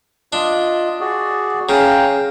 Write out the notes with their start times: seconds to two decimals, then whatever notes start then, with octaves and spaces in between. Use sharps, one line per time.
0.33 D4 F4 D#5
1.00 F#4 G#4 D5
1.69 C#3 F5 G5 A#5